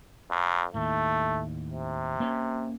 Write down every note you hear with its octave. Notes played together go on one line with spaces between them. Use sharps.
F2
D#2 A2 A3
C3
A#3 C#4